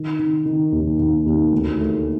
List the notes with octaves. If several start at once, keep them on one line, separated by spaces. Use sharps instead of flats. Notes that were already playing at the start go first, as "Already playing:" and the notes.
Already playing: D#3
D#3
D#3
D#2
D#2
D#2
D2
A3